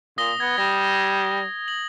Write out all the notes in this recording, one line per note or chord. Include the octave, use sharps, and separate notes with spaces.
A#2 D#6 A#6 G7
B3 G#6
G3 A#6
F#7